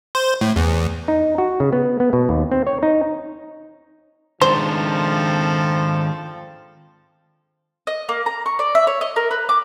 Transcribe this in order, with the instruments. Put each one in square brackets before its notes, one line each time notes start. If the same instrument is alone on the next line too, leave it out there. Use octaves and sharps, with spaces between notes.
[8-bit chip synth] C5
A2
E2
[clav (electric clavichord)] D#4
F#4
C#3
B3
B3
B2
D#2
C4
C#5
D#4
[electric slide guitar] D#3 G#3 D4 [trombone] F3 [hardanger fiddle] C4 A4 [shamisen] C5
[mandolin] D#5
A#3
A#5
C#6
D5
E5
C#5
D#5
A#4
B4
D6